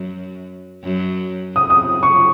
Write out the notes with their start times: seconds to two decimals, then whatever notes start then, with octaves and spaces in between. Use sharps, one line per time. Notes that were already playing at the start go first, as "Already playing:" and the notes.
Already playing: F#2
0.84 F#2
1.56 F#2 D#6
1.70 D#6
2.03 C#6